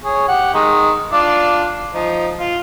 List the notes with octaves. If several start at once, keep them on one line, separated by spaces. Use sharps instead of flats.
G#4 C#5
G4 F#5
D#3 G#3 D#4
D4 F4 D5
F3 D#4
F4